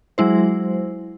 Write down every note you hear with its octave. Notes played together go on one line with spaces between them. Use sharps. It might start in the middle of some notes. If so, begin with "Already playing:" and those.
F#3 G#3 E4 C5